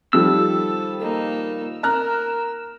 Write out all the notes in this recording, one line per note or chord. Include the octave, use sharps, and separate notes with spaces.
D#3 F3 G3 A4 E6
A#3 D#4
A#4 A#5 F6 F#6